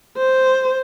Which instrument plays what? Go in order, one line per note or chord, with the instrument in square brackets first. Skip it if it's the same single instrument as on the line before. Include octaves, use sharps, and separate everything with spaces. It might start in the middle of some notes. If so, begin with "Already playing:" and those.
[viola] C5